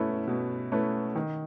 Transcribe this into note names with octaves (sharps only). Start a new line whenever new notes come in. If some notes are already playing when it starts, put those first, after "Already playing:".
Already playing: B2 A3 C#4 E4 B4
B2
A3 C#4 E4 B4
D#3